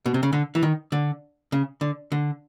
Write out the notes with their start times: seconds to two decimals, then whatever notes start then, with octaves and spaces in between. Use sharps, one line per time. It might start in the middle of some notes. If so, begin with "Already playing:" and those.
0.06 B2
0.14 C3
0.23 C#3
0.33 D3
0.55 E3
0.63 D#3
0.92 D3
1.52 C#3
1.81 D3
2.12 D3